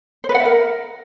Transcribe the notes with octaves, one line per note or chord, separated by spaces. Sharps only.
C5
B4
F#5
E5
A#4